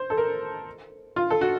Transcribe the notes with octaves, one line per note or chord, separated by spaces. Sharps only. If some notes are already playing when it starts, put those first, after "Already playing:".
Already playing: C5
A4
A#4
F4
A4
F#4